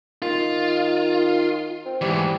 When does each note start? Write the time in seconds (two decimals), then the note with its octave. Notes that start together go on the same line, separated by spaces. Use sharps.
0.22 D#3 F4
1.85 C4
2.01 G#2 E3 G3